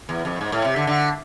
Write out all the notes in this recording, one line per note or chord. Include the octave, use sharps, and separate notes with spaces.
E2
F2
G#2
A2
C3
D3
D3